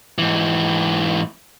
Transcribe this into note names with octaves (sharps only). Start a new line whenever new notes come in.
G#2 E3